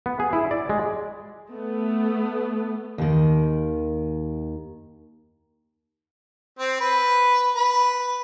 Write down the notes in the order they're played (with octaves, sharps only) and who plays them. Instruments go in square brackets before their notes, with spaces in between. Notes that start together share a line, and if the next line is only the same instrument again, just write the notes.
[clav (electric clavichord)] B3
G#4
E4
D5
G#3
[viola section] A3 B3
[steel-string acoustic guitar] D#2 D#3
[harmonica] C4
B4
B4